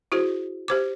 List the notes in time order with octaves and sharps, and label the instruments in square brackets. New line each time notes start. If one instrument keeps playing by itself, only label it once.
[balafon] E4 F#4 G#4 C5
G4 C5 D6